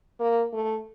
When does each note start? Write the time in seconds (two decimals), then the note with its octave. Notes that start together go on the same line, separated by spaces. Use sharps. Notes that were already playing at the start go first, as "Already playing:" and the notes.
0.20 A#3
0.53 A3